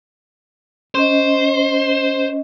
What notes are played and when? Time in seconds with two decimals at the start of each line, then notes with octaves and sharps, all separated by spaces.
0.95 C#4 C5 D#5